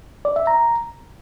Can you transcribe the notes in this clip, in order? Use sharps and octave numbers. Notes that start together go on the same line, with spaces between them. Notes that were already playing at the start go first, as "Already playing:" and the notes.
D5
E5
A#5